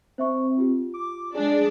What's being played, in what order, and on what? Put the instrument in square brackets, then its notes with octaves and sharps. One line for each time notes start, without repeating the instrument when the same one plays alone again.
[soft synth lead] C4 [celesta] C5 E5 C#6
[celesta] F4 G4
[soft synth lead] D6
[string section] G#3 D4 D5 [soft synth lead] G#4